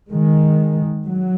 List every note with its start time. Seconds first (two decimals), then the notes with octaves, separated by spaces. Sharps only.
0.11 D#3 G#3
1.07 F#3